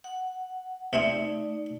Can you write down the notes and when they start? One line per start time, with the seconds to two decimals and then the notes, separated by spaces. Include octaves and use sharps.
0.04 F#5
0.93 C3 A3 C4 D#4 E4 D5